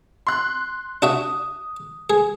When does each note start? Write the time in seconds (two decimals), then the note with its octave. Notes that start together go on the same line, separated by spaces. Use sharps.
0.27 C6 F#6
1.02 D4 F#4 E5 D#6
2.10 G#4